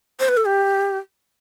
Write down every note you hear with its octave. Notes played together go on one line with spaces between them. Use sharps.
C5
B4
A4
G4